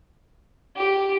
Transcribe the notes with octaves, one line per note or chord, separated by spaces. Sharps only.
G4